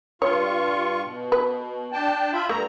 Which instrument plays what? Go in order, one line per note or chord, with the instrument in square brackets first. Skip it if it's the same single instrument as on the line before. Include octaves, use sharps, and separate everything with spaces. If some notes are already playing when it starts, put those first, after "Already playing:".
[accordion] G2 F4 C#6 [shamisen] C#5
[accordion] B2
[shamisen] B4
[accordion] D4 G5 A5
F4 E5 B5
[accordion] G2 A#5 [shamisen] A3